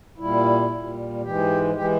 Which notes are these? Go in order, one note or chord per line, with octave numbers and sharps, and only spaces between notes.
A#2 G3 E4
A#2 G3
G#2 E3 G#3 G4
E3 G#3 G4